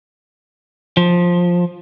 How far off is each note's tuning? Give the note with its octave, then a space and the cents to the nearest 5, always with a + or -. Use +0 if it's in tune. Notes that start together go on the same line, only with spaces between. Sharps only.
F3 +10